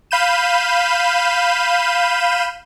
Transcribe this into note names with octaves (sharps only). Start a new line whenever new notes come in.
F5 B5 G6 D#7 E7